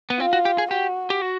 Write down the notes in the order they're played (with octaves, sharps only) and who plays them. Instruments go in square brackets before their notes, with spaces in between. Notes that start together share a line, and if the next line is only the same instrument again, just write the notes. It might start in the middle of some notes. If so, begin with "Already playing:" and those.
[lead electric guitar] B3
[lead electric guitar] C4 [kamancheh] F4
[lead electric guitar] F#4
G4
G#4
[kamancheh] F#4 [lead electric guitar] G4
[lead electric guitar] G4
F#4